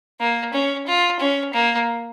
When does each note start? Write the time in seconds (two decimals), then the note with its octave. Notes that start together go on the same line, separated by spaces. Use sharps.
0.20 A#3
0.53 C#4
0.87 F4
1.20 C#4
1.53 A#3